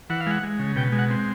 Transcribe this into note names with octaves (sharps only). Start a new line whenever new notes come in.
E3 F#5
F5
G#3 F#5
G#3
C#3
B2 G5
G#3
F#5
C4